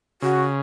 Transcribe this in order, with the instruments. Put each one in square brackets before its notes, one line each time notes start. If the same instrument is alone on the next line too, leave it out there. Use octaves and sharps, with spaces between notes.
[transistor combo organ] C#3 [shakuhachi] F#4